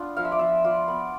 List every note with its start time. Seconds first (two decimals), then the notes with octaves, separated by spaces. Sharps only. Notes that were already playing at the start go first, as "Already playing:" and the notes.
Already playing: B3 D4 F4
0.17 F3 F5
0.25 E5
0.32 D5
0.39 F3 E5
0.64 F4 D5
0.88 B3